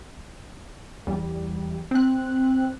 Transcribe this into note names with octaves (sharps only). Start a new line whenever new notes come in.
E2 G3
C4 F#6